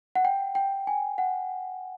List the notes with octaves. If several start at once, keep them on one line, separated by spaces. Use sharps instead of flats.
F#5
G5
G5
G#5
F#5